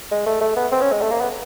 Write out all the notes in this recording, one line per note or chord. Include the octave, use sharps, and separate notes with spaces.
G#3
A3
A3
B3
C4
C#4
G#3
A3
A#3
B3